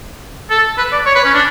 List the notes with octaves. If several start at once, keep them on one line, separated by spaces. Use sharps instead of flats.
A4
B4
D5
C#5
B4
C#4
D4